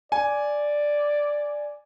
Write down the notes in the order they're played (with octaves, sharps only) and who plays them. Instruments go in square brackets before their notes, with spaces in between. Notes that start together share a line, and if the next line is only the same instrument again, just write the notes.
[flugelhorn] D5 [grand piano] G#5